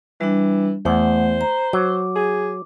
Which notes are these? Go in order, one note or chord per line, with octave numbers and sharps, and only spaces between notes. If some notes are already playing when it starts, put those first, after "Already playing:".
E3 G3 D4
E2 A3 C5 F#5
A#5
F#3 D6
G#4